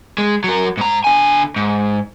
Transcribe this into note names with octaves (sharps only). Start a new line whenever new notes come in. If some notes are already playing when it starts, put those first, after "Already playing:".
G#3
F#3 A#4
G#2 A#5
D3 G#5
G#2